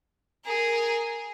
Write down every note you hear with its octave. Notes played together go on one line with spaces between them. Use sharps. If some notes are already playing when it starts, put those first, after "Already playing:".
G#4 A#4